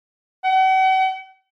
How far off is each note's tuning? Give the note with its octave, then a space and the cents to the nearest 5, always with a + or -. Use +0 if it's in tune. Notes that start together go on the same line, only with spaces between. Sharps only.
F#5 +40